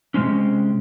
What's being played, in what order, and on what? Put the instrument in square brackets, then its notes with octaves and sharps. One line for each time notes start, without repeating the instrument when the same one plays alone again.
[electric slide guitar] C3 G#3 C4 C#4